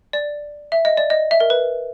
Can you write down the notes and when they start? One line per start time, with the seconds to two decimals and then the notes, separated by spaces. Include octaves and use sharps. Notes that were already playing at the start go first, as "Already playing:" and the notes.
0.13 D5
0.72 E5
0.85 D#5
0.97 D5
1.10 D#5
1.31 E5
1.40 A#4
1.50 B4